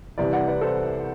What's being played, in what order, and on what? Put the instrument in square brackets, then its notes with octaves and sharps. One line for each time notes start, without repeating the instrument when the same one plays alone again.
[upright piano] C2 C3 E3 B4 D5
D5 F#5
B4 D5
A4 C5